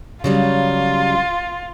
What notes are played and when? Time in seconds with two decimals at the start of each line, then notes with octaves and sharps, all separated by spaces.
0.24 C#3 F#3 G3 F4